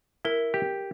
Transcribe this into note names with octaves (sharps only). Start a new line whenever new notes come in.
E4 A#4
G4